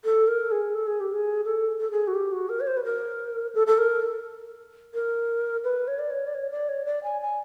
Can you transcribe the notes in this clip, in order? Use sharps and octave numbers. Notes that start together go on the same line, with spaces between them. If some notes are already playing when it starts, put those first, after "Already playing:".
A4
A#4
G#4
A4
G#4
G4
G#4
A4
A4
G#4
F#4
G4
F#4
A#4
C#5
C5
B4
A#4
A4
A4
A#4
A#4
B4
C#5
D5
C#5
D5
C#5
D5
C#5
D5
G#5
G#5